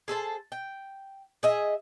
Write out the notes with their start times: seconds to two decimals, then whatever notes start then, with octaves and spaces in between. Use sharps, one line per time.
0.08 G#4 A4 C5 A5
0.52 G5
1.43 G#4 D#5 E5